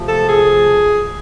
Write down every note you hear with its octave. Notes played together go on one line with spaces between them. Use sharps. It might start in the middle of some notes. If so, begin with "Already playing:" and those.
Already playing: C3 F3 A3
A4
G#4